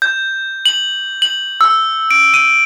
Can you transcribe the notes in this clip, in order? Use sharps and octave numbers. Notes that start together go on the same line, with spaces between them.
G6
F#7
F#7
E6
D7
D#7